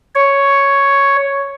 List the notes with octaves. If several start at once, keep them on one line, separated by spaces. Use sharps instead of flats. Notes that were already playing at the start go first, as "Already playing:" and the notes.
C#5